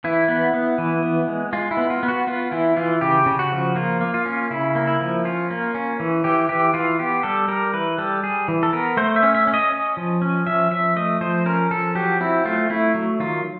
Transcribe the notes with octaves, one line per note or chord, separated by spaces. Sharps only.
E3 E4
B3
B3
E3
B3
G#3
G#3 F4
E4
B3
F4
B3
F#4
B3 F4
E3 E4
E3 F4
C#3 G4
C#3
F#4
F3
A#3 F4
A#3
F4
C#4
C#3 E4
A#3
E4
F3
C#4 F4
A#3
C#4
E3
E3 G4
E3 G4
E3 F4
B3 G4
G3 A4
G3 A#4
E3 B4
G3 A4
G3 G#4
E3
A4
B3 A#4
A3 C5
E5
C#4
E5
C#4
D#5
C#4
F3
C#4
F3 E5
F3 E5
A3 D#5
F3 C5
C#4 A#4
F3 A4
F#3 G4
C4 E4
A3 F4
A3 E4
F#3
D#3 F4